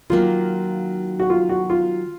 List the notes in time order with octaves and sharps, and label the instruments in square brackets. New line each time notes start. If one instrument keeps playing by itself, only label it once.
[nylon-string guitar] D#3 F#3 A#3 [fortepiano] F4
[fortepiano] F#4
F4
F#4
F4